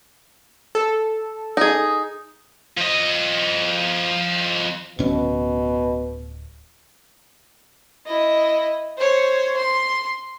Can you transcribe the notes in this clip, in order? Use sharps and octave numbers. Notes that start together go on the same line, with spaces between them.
A4
D#4 G#4
F3 D#5
D1 B2 C#4
E4 D#5
C5 C#5
C6